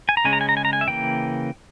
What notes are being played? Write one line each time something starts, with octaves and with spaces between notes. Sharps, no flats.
G#5
A#5
C#3 G#3 C#4 G#5
A#5
G#5
A#5
G#5
A#5
G#5
E5
C#3 E3 A#3 G5